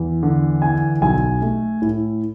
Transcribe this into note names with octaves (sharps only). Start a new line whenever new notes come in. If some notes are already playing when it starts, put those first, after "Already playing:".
Already playing: E2
D3
E3 G#5
B1 G#5
A3
A2